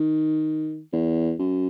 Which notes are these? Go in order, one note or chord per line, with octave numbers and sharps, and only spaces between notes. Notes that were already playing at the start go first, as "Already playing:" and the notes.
Already playing: D#3
E2
F#2